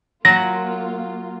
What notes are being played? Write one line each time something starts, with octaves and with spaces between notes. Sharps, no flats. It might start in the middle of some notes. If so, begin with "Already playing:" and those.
F#3 A#3 F4 A#6